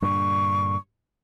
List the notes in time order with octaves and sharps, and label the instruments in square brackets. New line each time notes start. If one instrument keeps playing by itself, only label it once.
[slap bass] G2 A#2 D3 [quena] C#6